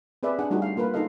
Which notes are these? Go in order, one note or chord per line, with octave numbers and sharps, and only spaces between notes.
C4 G#4 B4 D5 E5
D4 G#4 F#5
G3 A3 D#4 E4 F#4 G#4
F5
A#3 F4 A#4 B4
D#4 F4 A4 D#5 F5